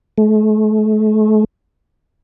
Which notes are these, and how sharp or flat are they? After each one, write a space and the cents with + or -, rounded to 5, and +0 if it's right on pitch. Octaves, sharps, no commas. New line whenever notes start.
A3 -40